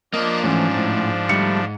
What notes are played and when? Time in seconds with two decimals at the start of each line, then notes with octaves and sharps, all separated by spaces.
0.14 F3 A#3 D4 D#5
0.44 G#2 E3 A3 C#4
0.75 A2
1.29 D3 G3 A3 C#7